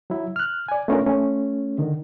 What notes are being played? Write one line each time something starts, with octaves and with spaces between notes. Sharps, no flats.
F#3 E4
F6 F#6
D5 G#5
A3 B3 C#4 D4 F4 A#4
A3 C#4
D3 D#3